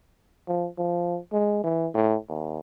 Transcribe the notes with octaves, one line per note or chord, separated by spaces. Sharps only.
F3
F3
G#3
E3
A2
D#2